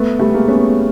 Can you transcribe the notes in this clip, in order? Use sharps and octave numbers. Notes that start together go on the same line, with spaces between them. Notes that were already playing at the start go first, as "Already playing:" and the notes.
Already playing: A3 B3
G3 A3
B3
G#3 A#3
B3 C#4